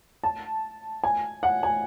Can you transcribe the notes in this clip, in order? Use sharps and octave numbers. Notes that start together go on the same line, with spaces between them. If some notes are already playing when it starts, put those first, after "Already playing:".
A5
G#5
F#5
G#5